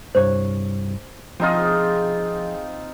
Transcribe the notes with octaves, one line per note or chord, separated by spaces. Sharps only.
C2 G2 C5 C#5
B2 F3 C4 D#4 F4 G#4 D#5